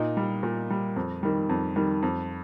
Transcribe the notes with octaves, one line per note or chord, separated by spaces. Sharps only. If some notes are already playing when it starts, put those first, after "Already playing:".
Already playing: A#2 D#4
G3
A#2
G3
F2
D#3 G3
F2
D#3 G3
F2